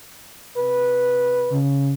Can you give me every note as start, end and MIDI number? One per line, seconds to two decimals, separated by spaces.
0.57 1.59 48
0.57 1.59 71
1.52 1.93 49